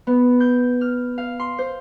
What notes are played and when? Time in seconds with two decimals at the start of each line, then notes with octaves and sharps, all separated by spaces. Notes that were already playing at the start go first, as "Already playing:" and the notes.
0.07 B3
0.40 G6
0.81 F6
1.18 F5
1.40 C6
1.58 C5